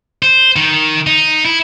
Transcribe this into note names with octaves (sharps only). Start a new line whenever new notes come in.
C5
D#3
D#4
E4